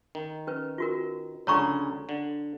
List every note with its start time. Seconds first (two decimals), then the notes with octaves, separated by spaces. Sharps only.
0.15 D#3
0.47 C#4 B4
0.78 F4 F#4 A#4
1.47 C#2 D3 G#4 C#5 A#5 C#6
2.09 D3